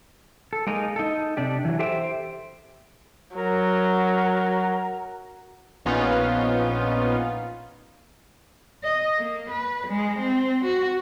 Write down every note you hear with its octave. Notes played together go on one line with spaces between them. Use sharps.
A4
G#3 A#3 D#4 A#4
D#4 A4
C3 D4 G4
E3 F#3
G4 A4 C5 E5 G5
F#3 A#4
A#1 B3 C#4 D#4 F4
D#5
A#3
B4
G#3
C4
F#4